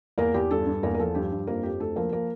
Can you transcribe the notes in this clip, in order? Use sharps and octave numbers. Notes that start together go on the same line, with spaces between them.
E2 A#3 A#4
E2 G4
G2 A4
G2
E2 A#3 A#4
A#4
F3 A4
G2 G4
G2
F2 A#3 A#4
F2 G4
D2 A4
F3 A#3 A#4
A#3 A#4